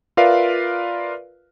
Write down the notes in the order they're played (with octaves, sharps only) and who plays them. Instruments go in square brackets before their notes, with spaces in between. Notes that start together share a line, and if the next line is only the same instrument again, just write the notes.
[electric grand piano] F4 A#4 B4 D5 E5 F5